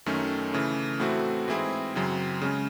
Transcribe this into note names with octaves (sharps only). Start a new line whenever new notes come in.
F#2 D#3 A3 C#4
C#3 E3 A3
A2 E3 A3 C4 F#4
G#2 E3 C4 E4 G#4
F#2 C#3 F#3 C4
C#3 G#3 C#4